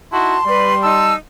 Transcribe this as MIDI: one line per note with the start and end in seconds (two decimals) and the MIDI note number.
0.12 0.37 63
0.12 0.37 64
0.12 0.37 66
0.12 0.45 81
0.12 1.03 84
0.46 1.14 55
0.46 0.72 71
0.46 0.72 74
0.83 1.14 63
0.83 1.14 81
0.83 1.14 88